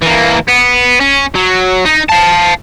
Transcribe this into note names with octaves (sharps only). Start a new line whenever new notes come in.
E3 A#3
B3
C#4
F#3
D#4
F5 A5